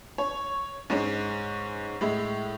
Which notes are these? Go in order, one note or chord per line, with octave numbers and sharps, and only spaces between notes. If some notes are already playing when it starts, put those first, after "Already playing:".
C#5
G#2 G#3 C#4
A2 G#3 E5